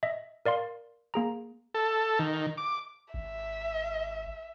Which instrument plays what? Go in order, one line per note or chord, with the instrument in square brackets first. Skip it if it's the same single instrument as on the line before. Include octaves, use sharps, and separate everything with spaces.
[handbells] D#5 E5
A#4 D5 F5 C6
A#3 G#4 A#5
[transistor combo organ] A4
D#3
D6
[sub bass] G#1 [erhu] E5